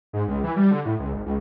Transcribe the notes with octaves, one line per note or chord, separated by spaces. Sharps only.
G#2
C#2
E3
G3
D3
A2
C#2
G#1
C#2